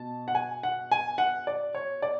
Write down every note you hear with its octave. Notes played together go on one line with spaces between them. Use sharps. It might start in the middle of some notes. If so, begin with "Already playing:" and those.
Already playing: B2 A5
F#5
G#5
F#5
G#5
F#5
D5
C#5
D5